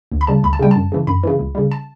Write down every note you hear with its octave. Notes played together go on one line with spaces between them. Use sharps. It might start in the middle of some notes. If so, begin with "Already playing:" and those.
D2
B5
C#3 G3 A5
D2 B5
A5
C#3 G3 G5
F#2 A5
C#3 E3
F#2 B5
C#3 E3
C#2
C#3 G3
A5